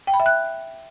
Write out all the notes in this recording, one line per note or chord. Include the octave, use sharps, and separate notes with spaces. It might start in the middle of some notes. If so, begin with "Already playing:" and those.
G5
B5
E5
F#6